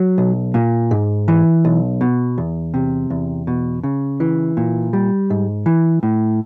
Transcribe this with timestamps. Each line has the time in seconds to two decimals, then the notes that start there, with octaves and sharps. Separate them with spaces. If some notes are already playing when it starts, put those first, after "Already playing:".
Already playing: F#3
0.18 B1
0.54 A#2
0.91 G#2
1.28 E3
1.65 B1
2.01 B2
2.38 E2
2.74 C3
3.10 E2
3.47 B2
3.84 C#3
4.20 E3
4.57 A#2
4.93 G3
5.30 G#2
5.66 E3
6.03 A2